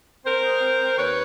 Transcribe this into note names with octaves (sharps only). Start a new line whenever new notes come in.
C4 A#4 C5
G#3
C4
C4
D#2 B4 C#5